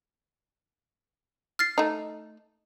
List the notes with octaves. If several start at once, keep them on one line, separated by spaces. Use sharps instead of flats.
F6 A6 C7
A3 D#4